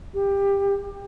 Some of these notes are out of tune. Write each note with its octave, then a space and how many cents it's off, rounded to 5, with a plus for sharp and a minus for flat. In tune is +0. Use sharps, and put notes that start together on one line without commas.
G4 +20